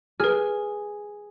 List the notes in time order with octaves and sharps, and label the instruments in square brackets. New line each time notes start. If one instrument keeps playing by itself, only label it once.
[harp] G#4 [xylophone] B4 F6